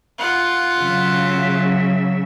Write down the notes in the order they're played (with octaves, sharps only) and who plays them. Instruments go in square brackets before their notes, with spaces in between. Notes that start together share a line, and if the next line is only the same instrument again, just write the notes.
[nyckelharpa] F4 F#5
[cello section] C#3 F#3 E5